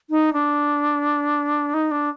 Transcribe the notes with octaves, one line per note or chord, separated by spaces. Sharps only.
D#4
D4
D#4
D4